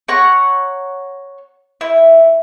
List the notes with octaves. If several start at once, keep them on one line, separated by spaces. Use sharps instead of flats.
C#5 F#5 A#5 C#6
E4